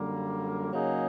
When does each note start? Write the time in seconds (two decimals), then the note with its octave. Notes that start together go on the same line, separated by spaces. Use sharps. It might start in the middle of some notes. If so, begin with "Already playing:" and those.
Already playing: F#2 D3 G3 A#3
0.73 C#3 F#3 A#3 D#4 G#4